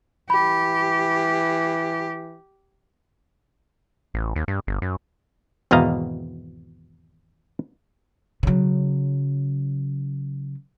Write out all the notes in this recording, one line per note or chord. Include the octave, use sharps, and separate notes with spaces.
E3 G4 B5
A1
D#2
G2
G1
F#2
G#1 E2 B2 D#5 F5 A#5
C#3 F#3